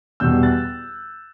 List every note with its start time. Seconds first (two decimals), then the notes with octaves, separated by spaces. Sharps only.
0.20 E2 B2 G3 E6 G6
0.43 F#6 A6